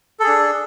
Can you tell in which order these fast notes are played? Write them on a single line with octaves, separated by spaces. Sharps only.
A4 G#4 D4